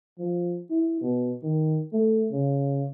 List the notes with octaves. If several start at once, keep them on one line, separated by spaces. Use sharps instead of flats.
F3
E4
B2
D#3
A3
C#3